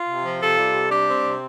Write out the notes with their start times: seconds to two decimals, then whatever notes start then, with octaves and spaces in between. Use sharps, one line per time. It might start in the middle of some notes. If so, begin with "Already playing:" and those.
Already playing: F4
0.08 C3
0.24 F3
0.41 C3 F4 A4
0.58 G3
0.75 C3
0.91 G3 D4 G4
1.08 C4
1.24 C3